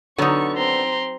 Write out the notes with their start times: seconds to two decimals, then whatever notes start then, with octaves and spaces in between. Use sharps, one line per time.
0.18 D3 F#3 B3 D#4 C#6
0.57 C4 A#5 C6